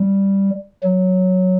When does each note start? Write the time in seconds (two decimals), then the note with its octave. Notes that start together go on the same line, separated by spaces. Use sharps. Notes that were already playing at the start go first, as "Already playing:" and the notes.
Already playing: G3
0.83 F#3